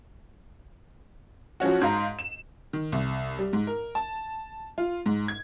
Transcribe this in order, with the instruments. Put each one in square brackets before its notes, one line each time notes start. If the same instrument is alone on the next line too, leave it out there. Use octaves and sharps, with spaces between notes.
[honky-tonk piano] F3 F#3 C#4 F#4
G#2 F5 A#5
E7
D#3
C2
G3
G#2
A#4
A5
F4
G#2
G#6